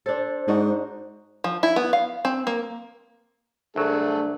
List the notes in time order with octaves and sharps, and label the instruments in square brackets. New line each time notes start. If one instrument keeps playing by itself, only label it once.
[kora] D4 A4 [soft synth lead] C5
[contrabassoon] G#2 [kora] D4 D#4 F#4
[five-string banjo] F3
E4
B3
F5
C4
A#3
[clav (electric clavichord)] C2 F#3 [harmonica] A3 G#4 A4 [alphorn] D4